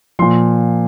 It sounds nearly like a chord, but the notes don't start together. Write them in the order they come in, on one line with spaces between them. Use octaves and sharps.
F3 C6 A#2